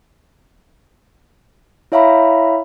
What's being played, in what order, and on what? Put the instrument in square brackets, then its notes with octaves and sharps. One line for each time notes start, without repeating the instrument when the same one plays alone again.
[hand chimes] E4 C#5 E5 F5 A#5 B5